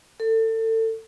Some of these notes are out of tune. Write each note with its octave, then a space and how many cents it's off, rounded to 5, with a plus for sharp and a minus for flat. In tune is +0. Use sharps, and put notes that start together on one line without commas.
A4 +30